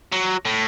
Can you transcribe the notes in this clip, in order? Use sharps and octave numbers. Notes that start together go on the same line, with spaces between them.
F#3
A2